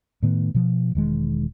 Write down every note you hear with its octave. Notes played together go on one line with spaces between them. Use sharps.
A2 D#3 A3 B3
B2 F3
E1 D#3 G#3